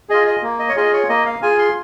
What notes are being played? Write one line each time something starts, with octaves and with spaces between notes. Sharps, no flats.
F4 G#4 D#5
D#5
A#3
D#5
C#5
F4 G#4 D#5
C#5
A#3 D#5
F5
F4 G#4 G#5
C6